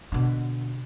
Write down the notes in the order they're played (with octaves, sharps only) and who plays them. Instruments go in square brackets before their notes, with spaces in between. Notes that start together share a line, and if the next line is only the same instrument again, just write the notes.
[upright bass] B2 D3